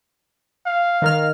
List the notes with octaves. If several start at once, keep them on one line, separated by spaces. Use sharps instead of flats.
F5
D#3 A#4 F6